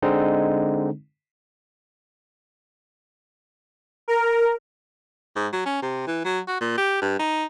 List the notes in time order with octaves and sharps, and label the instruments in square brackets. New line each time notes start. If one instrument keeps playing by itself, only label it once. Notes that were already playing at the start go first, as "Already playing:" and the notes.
[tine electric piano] D3 G#3 C4 D#4
[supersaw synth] A#4
[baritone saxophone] G#2
F#3
C#4
C3
E3
F#3
F#4
A#2
G4
G2
D#4